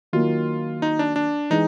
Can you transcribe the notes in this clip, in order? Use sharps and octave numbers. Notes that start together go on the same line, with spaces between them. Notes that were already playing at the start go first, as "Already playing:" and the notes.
D#3 F#3 A#3 F4
D#4
D4
D4
E3 G#3 D#4